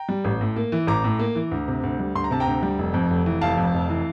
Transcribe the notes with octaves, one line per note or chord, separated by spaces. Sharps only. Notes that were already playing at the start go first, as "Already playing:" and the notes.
Already playing: G5 A#5
G3
A1
A2
A#3
E3
A1 A#5 D6
A2
A#3
E3
D2
C3
D2
G3
D2 C6
A#5
C3 A5
G5 A#5
D2
G3
F1
F2
F1
E3
F1 F5 A5
F2
F1
E3